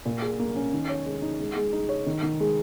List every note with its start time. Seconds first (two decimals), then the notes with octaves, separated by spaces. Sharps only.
0.05 A#2
0.22 G#4
0.39 A#3
0.55 C#4
0.73 D#3
0.89 C#5
1.06 G#3
1.22 D#4
1.40 G#3
1.56 G#3
1.73 D#4
1.89 C#5
2.06 D#3
2.23 D#3
2.40 G#3